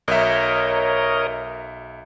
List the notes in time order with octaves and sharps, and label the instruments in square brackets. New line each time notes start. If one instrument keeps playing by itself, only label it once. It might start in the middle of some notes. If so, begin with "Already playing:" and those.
[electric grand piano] B1 E5 [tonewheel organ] A#4 C#5 D#5